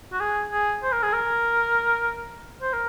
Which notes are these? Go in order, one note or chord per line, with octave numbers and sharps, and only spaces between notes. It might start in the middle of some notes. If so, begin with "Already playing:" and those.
F#4
G#4
G#4
C5
A#4
G#4
A#4
C5
A#4